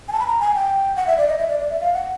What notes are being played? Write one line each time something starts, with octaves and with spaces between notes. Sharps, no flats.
G#5
A5
B5
A#5
G#5
G5
F#5
E5
D5
D#5
E5
D5
D5
E5
F5
F#5